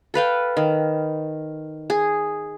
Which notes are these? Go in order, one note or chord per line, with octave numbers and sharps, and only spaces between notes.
A4 B4 F5 G5
D#3
G#4